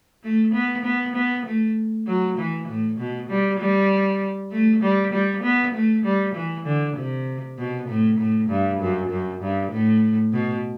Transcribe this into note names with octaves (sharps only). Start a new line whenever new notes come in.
A3
B3
B3
B3
A3
F#3
E3
A2
B2
G3
G3
A3
G3
G3
B3
A3
G3
E3
D3
C3
B2
A2
A2
G2
F#2
F#2
G2
A2
B2